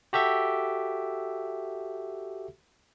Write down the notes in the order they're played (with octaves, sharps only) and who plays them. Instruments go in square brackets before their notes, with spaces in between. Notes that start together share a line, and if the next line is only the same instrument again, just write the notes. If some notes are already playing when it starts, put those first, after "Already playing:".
[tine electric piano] F#4 G4 A4 E5